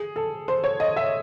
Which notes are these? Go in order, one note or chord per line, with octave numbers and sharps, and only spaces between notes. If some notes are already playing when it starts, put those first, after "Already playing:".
Already playing: G#4
A4
C5
C#5
D#5
E5